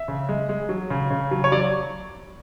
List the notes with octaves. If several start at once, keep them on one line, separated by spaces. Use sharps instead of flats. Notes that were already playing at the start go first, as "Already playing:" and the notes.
Already playing: E5
C#3
G#3
G#3
F#3
C#3
C#3
F#3
C#5
F#3 D5